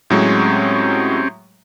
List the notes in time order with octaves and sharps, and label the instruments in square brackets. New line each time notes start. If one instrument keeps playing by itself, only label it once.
[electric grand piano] A2 F#3 G#3 [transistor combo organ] C4 C#4 G4